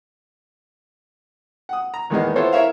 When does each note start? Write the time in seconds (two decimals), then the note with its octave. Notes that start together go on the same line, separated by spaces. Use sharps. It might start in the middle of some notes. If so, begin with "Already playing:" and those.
1.69 F#5 D#6
1.94 A#5
2.10 E2 D#3 G#3 A#3 B3 D#4
2.36 B3 E4 F4 A4 C5 C#5
2.52 E4 A#4 C#5 E5 F5